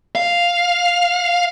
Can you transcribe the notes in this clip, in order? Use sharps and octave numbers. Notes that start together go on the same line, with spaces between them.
F5